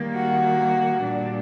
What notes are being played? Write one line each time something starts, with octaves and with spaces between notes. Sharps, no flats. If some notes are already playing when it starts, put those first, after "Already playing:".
Already playing: D#3 G3 A#3
F#4
A#2 G3 D4